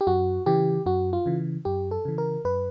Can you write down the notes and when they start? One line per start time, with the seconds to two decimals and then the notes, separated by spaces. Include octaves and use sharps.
0.01 G4
0.07 F#2 F#4
0.46 C#3 E3 G4
0.86 F#2 F#4
1.13 F4
1.26 C#3 E3
1.65 F#2 G4
1.91 A4
2.05 C#3 E3
2.18 A#4
2.45 F#2 B4